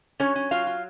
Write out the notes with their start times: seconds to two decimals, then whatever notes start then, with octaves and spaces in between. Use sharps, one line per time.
0.20 F#3 C#4 C#5
0.35 C#4
0.51 F#3 F4 F5
0.67 F4